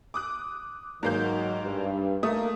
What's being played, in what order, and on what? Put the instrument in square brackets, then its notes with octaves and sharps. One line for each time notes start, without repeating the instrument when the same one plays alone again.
[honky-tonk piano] D6 D#6 F#6
[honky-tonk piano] G#2 A#3 G6 [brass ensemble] D#3 F#3
[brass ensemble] G2
[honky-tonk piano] A3 D#6 [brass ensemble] A#3